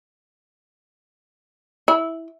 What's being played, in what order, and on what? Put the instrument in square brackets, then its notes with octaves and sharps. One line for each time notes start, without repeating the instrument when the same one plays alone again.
[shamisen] E4